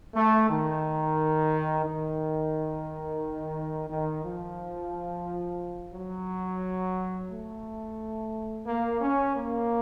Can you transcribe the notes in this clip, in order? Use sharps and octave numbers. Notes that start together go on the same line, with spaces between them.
A3
D#3
D#3
D#3
F3
F#3
A3
A#3
C#4
A#3